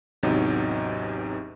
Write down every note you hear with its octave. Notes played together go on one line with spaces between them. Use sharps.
A1 E2 C3 F#3 D#4